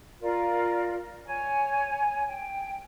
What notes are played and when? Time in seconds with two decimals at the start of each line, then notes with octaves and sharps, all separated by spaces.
0.21 F4 A#4 D5
1.25 C#5 G#5
2.27 G5